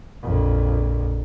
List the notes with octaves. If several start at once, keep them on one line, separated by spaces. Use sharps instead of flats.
A#1 F2